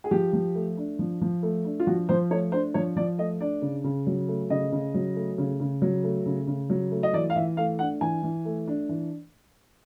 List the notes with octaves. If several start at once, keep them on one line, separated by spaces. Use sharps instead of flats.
G#4
F3 G4
F3
A3
D4
F3
F3
A3
D4
F4
F3 F#4
F3 C5
A3 C#5
D4 C5
F3 C#5
F3 D5
A3 D#5
D4 D5
C#3
C#3
F#3
A3
C#3 D#5
C#3
F#3
A3
C#3
C#3
F#3
A3
C#3
C#3
F#3
A3
D#5
E3 D5
F5
E3 E5
A3 F5
D4 F#5
E3 G#5
E3
A3
D4
E3